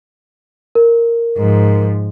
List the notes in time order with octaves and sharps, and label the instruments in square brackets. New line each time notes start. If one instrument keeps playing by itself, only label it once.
[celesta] A#4
[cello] G#2 F3